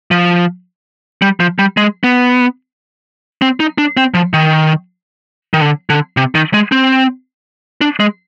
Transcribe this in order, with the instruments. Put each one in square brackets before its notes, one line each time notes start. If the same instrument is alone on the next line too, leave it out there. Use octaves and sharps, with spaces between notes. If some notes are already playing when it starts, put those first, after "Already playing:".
[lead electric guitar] F3
G3
F3
G3
G#3
B3
C4
D#4
D4
C4
F3
D#3
D#3
D3
D3
C3
D#3
G#3
C4
D4
G#3